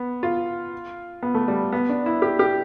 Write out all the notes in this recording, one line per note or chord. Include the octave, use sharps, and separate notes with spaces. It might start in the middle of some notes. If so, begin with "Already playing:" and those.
Already playing: B3
F4
B3
A3
G3
B3
D4
E4
G4
G4